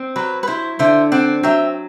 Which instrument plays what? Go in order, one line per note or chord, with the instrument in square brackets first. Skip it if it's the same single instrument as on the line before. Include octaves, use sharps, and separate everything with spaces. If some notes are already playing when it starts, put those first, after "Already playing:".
Already playing: [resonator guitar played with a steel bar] C4
[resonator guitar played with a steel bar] F#3 [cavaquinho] B4
[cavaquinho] B4
[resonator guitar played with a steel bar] E4 [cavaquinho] C5
[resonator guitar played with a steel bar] D3 [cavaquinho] C5 E5
[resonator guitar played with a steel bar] C4 [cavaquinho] D5 F#5
[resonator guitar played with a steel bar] F#3 [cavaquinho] E5 G5